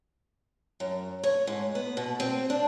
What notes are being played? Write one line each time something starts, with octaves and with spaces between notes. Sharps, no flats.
F#2
C#5
G#2
B3
B2
C4
D4